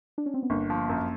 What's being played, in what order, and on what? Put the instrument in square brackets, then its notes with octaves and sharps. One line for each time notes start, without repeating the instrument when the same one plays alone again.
[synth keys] D4
C#4
C4
B3
[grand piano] G1 [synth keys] A#3
[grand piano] F3
F#2